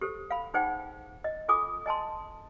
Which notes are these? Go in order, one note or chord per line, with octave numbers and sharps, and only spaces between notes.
G4 A4 C5
F5 B5
D#4 G#4 C5 F#5 G5
D#5
F4 A4 G#5 D6 D#6
D#5 G#5 A5 C6